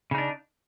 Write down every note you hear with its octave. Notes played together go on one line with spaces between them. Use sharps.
C#3 D4 D#4